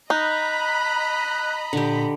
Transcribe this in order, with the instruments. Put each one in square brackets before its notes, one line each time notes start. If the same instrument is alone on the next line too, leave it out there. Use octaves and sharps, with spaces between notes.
[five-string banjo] D#4 [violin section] D#5 A#5 B5 [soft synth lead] F#6
[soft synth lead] A#2 [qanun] D3 G4